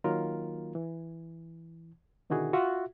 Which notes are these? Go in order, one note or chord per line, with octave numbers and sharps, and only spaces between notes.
D#3 F#3 A#3 F4 A#4
E3
B2 D3 D#3 E4 F#4 G#4
F4 F#4 E5